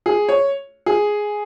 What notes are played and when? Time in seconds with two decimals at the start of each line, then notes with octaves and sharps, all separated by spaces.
0.06 G#4
0.29 C#5
0.86 G#4